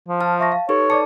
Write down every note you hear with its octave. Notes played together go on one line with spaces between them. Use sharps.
F3
F4 A5 F6
E5 C#6 A#6
F5
D#4 G4 A4 B4 C#5
D5 A5 D6 C#7